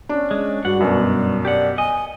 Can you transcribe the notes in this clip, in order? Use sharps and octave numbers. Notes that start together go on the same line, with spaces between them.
C#4 D4
G#3
G2 F#4 F#5
F#2 B2 D4
G4 D5 F#5
D#5 G#5